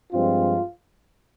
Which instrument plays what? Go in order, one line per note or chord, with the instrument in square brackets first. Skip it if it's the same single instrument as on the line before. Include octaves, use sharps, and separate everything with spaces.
[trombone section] G2 F3 G#3 C4 F4